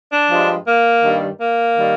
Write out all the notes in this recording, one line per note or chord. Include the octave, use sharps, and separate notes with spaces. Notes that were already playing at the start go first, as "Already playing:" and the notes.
D4
G2 F3 G#3
A#3
G2 D#3 G3
A#3
D#3 G3